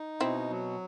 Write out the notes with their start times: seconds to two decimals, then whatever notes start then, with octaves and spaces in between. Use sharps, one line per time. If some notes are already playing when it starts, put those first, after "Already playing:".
Already playing: D#4
0.21 B2 C4 E4
0.50 F#3